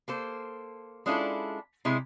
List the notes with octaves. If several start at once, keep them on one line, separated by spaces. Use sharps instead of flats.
A#3 A4 C5
G#3 C#4 D4 E4 F4 A4
C3 G#3 E4